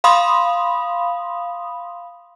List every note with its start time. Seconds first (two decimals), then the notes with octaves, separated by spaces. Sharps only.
0.04 F5 B5 C6 D#6